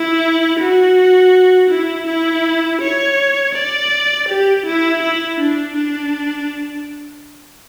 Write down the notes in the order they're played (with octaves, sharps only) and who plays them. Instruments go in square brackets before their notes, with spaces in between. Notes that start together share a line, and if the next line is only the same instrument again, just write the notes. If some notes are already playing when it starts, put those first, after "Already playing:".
Already playing: [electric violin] E4
F#4
E4
E4
C#5
D5
G4
E4
E4
D4
D4